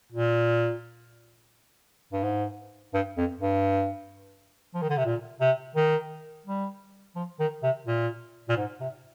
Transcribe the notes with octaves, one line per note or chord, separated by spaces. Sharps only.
A#2
G2
G#2
G2
F2
G2
F3
D#3
D3
C3
A#2
C3
D#3
G3
F3
D#3
C3
A#2
A#2
G#2
C3